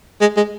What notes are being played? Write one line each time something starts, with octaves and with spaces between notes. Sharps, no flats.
G#3
G#3